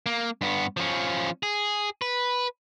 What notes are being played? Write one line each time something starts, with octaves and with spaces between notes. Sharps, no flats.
A#3
G2 B3
F3 C#4
G#4
B4